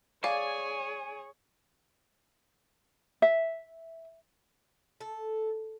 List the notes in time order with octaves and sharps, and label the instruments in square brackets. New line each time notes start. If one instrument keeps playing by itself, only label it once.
[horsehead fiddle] G#4 C#5 [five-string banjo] D5 [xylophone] F5 [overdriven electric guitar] G#5
[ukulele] E5
[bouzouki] A4